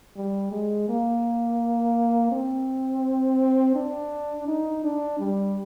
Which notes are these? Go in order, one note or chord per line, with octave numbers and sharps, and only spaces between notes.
G3
G#3
A#3
C4
D4
D#4
D4
G3